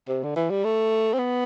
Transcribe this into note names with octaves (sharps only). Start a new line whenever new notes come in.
C3
D3
E3
G3
A3
C4
B3